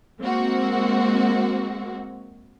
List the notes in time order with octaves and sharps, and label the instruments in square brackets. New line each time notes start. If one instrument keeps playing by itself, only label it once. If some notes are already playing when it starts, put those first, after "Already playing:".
[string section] G#3 A#3 C4 F#4